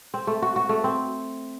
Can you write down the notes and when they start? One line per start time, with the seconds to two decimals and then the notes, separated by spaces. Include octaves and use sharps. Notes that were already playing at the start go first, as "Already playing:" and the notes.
0.14 C4
0.27 A3
0.42 F#4
0.56 F#4
0.69 A3
0.84 C4